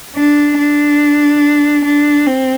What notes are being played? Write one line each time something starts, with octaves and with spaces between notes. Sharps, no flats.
D4
D4
D4
C4